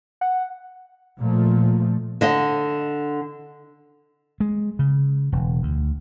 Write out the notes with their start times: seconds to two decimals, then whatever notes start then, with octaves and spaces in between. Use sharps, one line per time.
0.21 F#5
1.18 A#2 F3 A3
2.21 D3 D#5
4.40 G#3
4.79 C#3
5.32 E1
5.63 D2